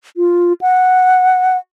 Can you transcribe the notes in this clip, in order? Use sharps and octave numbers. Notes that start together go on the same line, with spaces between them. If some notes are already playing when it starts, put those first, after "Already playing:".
F4
F#5